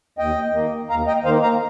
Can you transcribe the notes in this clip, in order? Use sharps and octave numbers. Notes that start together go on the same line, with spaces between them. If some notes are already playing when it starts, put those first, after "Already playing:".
D#2 D#5 G5
D#3 A#3
D#2 F5 A#5
D#5 G5
D#3 A#3 C5 F5
F5 A#5